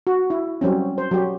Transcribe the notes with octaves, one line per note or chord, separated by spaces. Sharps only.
F#4
E4
F#3 G3 C4 C#4
C5
F#3 G4